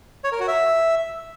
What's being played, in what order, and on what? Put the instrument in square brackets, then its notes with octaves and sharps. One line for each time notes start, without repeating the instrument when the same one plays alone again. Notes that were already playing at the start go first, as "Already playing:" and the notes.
[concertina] C#5
A#4
F#4
E5